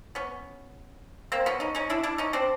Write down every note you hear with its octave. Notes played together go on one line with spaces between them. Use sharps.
B3 C#4
A#3 C4
B3 C#4
C#4 D#4
C#4 D#4
D4 E4
D4 E4
C#4 D#4
C4 D4